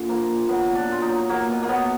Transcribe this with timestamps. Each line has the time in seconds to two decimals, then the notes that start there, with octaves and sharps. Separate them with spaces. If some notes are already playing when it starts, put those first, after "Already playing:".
Already playing: A#2 D3
0.09 F3 A#3
0.29 A#2
0.49 F#3 B3
0.69 A#2
0.75 D4
0.89 A#2 F4
1.02 D#4
1.09 F#3
1.29 F#3 A#3
1.49 B2
1.63 A#3
1.69 F#3 B3